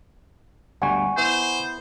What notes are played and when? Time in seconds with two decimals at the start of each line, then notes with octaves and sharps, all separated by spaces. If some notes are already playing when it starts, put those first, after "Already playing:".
0.82 G1 D2 G3 F#5 G#5 C#6
1.17 B3 E4 C5